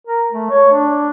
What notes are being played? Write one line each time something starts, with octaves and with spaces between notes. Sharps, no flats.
A#4
A3
C#5
D4